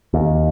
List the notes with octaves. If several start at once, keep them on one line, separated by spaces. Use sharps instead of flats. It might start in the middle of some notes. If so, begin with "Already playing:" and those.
D#2